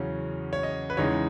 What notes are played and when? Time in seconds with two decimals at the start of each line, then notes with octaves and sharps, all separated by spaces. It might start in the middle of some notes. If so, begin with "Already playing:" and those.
Already playing: E2 C#3 F#3 C#4
0.53 C#5
0.63 D#5
0.90 B4
0.97 E2 C#3 G#3 D#4 C#5